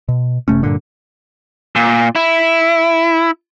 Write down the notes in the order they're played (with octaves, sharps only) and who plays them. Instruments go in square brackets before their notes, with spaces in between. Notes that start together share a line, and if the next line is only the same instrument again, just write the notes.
[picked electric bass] B2
F#1 C3 A3 C#4
G2 A#2 D3
[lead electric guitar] A#2
E4